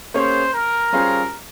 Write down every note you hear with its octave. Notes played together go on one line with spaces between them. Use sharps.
A#3 C#4 G#4 C5 C#5
A#4
G3 C#4 F4 G#4 C5